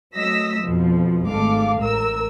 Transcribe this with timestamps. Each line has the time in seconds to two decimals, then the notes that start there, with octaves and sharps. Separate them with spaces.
0.15 F#3 A3 D#5 E6 A#6 B6
0.62 F2 B2 F3
1.28 G#1 G#3 A3 A4 F5 D6
1.79 A1 A#4 E6